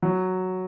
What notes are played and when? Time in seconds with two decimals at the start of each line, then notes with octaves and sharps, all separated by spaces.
0.02 F#3